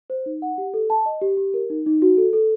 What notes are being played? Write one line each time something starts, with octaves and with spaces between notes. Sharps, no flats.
C5
D#4
F#5
G4
A4
A5
D#5
G4
G4
A#4
D#4
D#4
F#4
A4
A4